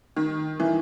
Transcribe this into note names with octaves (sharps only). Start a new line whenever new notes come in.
D#3
E3